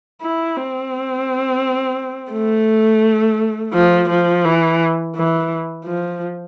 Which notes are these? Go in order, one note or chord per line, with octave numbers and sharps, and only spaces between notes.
E4
C4
A3
F3
F3
E3
E3
F3